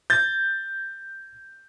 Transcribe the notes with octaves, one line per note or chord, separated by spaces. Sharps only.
G6 A6